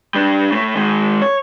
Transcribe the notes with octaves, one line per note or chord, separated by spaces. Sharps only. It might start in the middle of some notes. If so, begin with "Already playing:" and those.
G3 D4
A2 A3
D#3 G#3
C#5